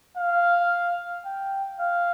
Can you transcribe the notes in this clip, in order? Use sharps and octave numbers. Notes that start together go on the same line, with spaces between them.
F5
G5
F5